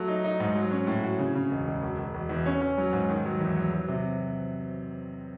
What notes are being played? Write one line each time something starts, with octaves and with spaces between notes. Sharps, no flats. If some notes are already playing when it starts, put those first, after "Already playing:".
Already playing: F#3 A3
D#4
D#4
G#2
F#3
C#4
A2
F#4
C#3
C#3
E1
E1
E1
E1
E1
E2
C#4
C#4
F#3
G#2
D#3
F#3
E2
F#3
F#3
C3